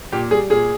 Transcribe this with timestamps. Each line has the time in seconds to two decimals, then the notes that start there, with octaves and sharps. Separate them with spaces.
0.12 A#2 G4
0.31 G3 G#4
0.50 A#2 G#4